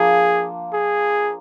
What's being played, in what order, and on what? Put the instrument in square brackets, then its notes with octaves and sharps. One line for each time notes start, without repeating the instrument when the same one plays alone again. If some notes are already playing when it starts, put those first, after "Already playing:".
Already playing: [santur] F3 A#3 D4 F4 [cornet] G#4
[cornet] G#4